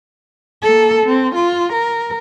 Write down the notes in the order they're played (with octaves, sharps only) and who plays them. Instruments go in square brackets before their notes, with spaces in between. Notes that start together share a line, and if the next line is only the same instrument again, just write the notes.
[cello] A#3 A4
C4
F4
A#4